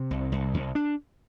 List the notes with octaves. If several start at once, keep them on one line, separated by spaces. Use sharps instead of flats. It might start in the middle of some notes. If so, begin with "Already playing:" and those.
Already playing: C3
C2
C2
C2
D4